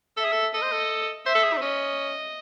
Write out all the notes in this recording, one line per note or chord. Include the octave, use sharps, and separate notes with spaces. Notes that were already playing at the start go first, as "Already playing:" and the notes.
A4 E5
G#4
A4
A4 D#5
C5
A4
C5 E5
A4
G#4
D#4
C4
C#4 D#5